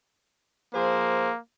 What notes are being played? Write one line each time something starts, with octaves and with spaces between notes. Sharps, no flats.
F3 A#3 G#4 C5